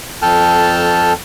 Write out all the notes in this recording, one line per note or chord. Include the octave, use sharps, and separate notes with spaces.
F2 A4 G5 A5 F6